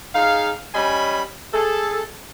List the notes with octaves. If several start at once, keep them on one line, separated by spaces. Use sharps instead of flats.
D#4 G#4 F5
G3 C#4 D#5 G#5 B5
G#4 A4